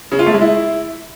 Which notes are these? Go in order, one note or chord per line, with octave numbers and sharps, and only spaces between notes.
C#3
F4
A3
G#3
E4